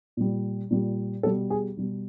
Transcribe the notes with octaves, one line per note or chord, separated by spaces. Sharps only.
A#2 G3
A#2 G3
B2 G3 A4
G#4
B2 G3